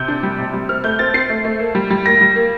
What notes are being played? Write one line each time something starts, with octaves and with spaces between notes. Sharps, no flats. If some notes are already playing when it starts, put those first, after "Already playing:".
Already playing: C3 G6
D4
G3
C3
G3
C4 F6
A3 G6
C4 A6
C4 C7
A3
A3
A#3
G3
G3
A#3 A#6
G3
A#3